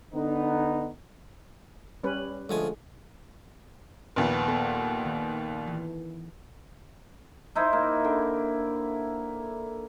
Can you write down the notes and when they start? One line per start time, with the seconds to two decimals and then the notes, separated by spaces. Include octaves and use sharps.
0.14 D3 B3 D#4
2.03 G3 C#4 B4
2.49 D2 F3 G#3 G#5
4.16 A#1 D#2 B3 B4
4.48 B3 A4
5.05 D#3
5.68 E3
7.55 D#4 E4 C5
7.73 A#3
8.04 D3